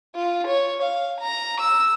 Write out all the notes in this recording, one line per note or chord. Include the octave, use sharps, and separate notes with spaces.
F4
C#5
F5
A#5
E6